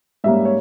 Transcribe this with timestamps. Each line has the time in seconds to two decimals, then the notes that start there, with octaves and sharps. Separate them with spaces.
0.24 G#2 G3 A#3 C#4 E5
0.45 C#5